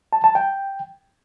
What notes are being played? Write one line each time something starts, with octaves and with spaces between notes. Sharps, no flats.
A5
A5
G5